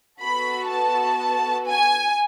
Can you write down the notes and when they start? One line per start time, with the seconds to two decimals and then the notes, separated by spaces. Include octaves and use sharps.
0.21 B3 F#4 A4 B5
0.70 A5
1.67 G#5